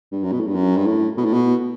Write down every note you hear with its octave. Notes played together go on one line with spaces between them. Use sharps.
G2
F#2
B2
A2
G2
F#2
G2
A2
B2
A2
B2